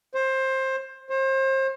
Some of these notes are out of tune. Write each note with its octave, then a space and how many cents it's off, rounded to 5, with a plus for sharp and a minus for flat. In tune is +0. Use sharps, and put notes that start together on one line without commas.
C5 +20
C5 +35